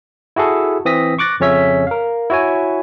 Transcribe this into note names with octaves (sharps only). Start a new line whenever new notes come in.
E4 F#4 G#4 A4
E3 C4 D#6 A#6 B6
C#6 D6 F#6 A6 A#6
F2 C#3 C#4 C#5 E5 B6
A#4 F5
E4 F#4 C#5 G#5